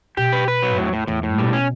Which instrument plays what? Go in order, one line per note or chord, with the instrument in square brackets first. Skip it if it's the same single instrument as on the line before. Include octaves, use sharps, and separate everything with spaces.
[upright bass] B2 [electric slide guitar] G4
[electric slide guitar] B4
B4
F#3
[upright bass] E2 [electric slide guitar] A2
[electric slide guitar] A2
[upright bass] E2 [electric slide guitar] A2
[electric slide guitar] A2
[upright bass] B2 [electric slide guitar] G3
[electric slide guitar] C#4